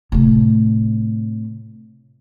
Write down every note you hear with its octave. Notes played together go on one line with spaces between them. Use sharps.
A2 C3